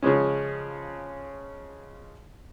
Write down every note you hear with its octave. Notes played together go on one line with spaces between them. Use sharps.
C#3 F3 G#3 C#4